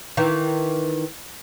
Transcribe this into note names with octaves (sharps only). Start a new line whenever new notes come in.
D#3 E3